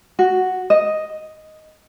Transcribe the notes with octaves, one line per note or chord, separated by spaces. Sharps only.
F#4
D#5